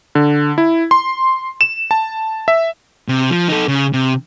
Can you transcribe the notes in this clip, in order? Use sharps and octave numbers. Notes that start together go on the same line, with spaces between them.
D3
E4
C6
E7
A5
E5
C3
F3
D#4 A4
C#3
C3